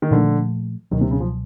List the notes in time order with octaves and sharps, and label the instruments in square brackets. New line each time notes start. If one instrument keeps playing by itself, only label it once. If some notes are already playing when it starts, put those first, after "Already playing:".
[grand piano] D#3
[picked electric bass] A#2 F3 A3 [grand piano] D3
[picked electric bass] C#2 B2 F#3 [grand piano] D#3
[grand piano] C3
C#3
F3